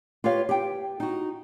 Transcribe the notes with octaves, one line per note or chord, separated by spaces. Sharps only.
F4 G4 B4 C#5 F5
G4 G5
D#4 F#4